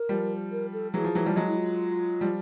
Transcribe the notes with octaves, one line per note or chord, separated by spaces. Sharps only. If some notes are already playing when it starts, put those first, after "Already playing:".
Already playing: A#4
F3 G3
A#4
A4
E3 F#3 G#4
F3
E3 F#3
F3 G3
F#3 G#3
E4
F4
F3 G3